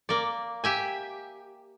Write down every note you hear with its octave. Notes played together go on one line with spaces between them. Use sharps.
A#3 D5
G4 E5 G#5